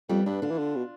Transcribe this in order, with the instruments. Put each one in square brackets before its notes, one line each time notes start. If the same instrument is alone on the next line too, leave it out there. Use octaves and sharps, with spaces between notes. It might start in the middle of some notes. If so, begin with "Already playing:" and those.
[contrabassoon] F2 [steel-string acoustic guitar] G3 B3
[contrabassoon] G2 [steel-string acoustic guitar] B3 D4
[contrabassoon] D3 [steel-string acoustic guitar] D4 F4
[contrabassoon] E3
D3
B2